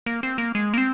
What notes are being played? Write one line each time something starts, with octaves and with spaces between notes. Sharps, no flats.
A#3
C4
A#3
G#3
A#3
C4